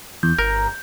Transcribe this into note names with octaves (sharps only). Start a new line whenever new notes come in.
E2 G6
G1 A#4 A#5